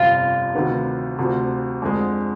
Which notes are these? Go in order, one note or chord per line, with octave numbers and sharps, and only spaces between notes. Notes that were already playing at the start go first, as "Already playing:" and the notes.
Already playing: G1 F2 C3 F3 F4
D2 C3 D#3 B3
D2 C3 F3
F2 D3 G#3